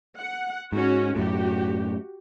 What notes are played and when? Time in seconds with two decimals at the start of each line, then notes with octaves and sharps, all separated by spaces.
0.19 F#5
0.72 G#2 C#4 F#4
1.16 F#2 A2 F#4 G4